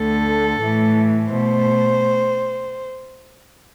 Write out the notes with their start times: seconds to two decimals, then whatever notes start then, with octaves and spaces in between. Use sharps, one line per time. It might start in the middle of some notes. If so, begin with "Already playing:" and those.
Already playing: D2 D3 A3 A4
0.60 A2 E3 A3
1.32 B2 A3 C5